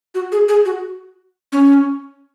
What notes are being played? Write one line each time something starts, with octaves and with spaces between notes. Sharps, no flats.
F#4
G#4
G#4
F#4
C#4